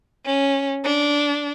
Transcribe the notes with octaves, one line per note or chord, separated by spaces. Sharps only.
C#4
D4